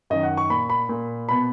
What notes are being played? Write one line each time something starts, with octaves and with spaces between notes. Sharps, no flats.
F#2 D#3 D#5
F#5
C#6
A#2 B5
B5
A#2
B2 B5